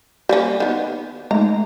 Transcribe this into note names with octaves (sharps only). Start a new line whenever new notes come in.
G3 A#3 C#4
D#3 B3
G#3 A3 D#4 A#5